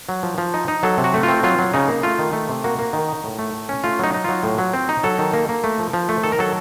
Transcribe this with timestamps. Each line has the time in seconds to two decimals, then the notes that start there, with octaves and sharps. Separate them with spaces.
0.09 F#3
0.23 F3
0.38 F3
0.54 D#4
0.68 D#4
0.83 F#3 A4
0.98 C3
1.04 F#4
1.14 A3
1.23 F4
1.28 C4
1.43 F#3 F4
1.59 F#3
1.74 C#3 D#4
1.88 A#3
2.03 A3 F4
2.19 D#3
2.33 A3
2.49 C3
2.64 A#3 F#4
2.79 A#3
2.93 D#3
3.09 D#4
3.24 A2
3.39 A3
3.53 A2
3.69 C#4
3.84 A3 F4
3.99 F#3 D#4
4.14 D#4
4.24 F#3 F4
4.43 A2
4.58 F#3
4.74 C4
4.89 D#4
5.04 F#3 A4
5.19 D#3
5.33 A#3
5.49 A#3
5.64 A3
5.79 F3
5.93 F3
6.09 A3
6.23 D#3 A4
6.32 A#4
6.39 F#3 A4